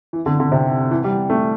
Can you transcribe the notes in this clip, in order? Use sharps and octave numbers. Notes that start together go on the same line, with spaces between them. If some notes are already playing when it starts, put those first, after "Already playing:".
E3
D3
D3
C3
E3
G3
A3